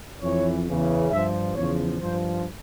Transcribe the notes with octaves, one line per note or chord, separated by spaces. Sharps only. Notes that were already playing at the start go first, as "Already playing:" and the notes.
F2 E3 C#5
E2 C#3 E3
G2 F3 E5
E2 C#3 F3 C#5
G2 F3 C5